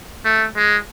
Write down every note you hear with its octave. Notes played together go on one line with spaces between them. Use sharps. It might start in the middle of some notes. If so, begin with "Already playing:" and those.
A3
G#3